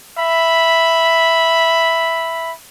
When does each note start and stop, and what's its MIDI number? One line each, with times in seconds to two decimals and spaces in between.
0.17 2.53 76
0.17 2.53 83